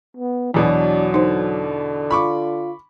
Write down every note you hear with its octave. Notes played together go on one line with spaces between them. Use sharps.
B3
E2 B2 E3 F#3 D4
D3 D#4 C5
F4 B5 C#6 D6